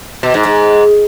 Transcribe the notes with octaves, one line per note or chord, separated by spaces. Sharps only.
B2
G#2
G#2